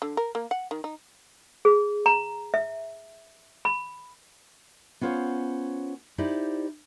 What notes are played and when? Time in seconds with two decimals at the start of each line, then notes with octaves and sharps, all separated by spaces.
0.02 D3
0.17 A#4
0.35 A#3
0.51 F#5
0.71 D#3
0.84 D#4
1.65 G#4
2.06 A#5
2.54 E5
3.65 B5
5.01 B3 C#4 F4 C5 C#5
6.18 D#4 E4 G4 C5 D5